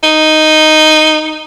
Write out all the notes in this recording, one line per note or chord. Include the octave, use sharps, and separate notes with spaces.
D#4